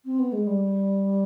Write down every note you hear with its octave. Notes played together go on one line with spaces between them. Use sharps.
C4
B3
G#3
G3